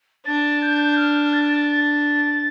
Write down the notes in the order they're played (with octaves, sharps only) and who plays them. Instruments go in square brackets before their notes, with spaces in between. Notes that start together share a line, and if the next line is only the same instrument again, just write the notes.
[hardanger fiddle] D4 [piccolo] A6
[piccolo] G6
F6
A6
A6